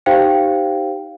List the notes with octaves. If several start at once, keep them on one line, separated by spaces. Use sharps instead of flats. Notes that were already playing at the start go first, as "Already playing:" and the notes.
D#4 G4 C5 F5 G5